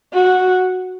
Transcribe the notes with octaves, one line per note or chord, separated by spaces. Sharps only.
F#4